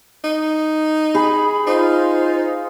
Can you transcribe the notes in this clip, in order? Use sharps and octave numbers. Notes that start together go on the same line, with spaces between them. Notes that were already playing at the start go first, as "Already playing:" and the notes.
D#4
G#4 B5
D#4 F4 C5